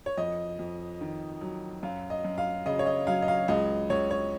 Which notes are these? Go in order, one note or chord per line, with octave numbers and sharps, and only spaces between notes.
C#5
F2 D#5
F2
D#3
F#3
F#2 F5
D#5
F#2
F5
C#3 D#5
C#5
D#5
F#3 F5
D#5
F5
C#2 D#5
C#2 C#5
C#5